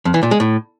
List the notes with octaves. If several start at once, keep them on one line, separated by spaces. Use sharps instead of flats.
F2
E3
A#2
G#3
A2